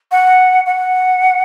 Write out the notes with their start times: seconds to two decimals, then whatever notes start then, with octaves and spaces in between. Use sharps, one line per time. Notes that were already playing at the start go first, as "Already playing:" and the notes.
0.11 F#5
0.66 F#5